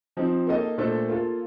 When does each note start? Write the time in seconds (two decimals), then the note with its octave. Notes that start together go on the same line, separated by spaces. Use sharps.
0.17 F3 C4 D#4
0.47 A#3 D#4 A4 D#5
0.78 A#2 A3 D4 A4 C5
1.08 A#3 F4 A4